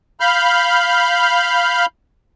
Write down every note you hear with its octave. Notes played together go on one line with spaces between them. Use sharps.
F5 B5 F6 G6